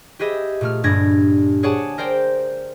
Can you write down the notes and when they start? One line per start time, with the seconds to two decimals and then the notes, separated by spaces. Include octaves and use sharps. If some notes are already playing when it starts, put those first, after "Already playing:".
0.19 G4 G#4 B4 D#5 E5
0.61 A#2 A3 F6
0.84 G1 G2 D4 G#6 A#6
1.63 G#4 C#5 D5 F#5 G#5 A5
1.98 A#4 C5 D5 G5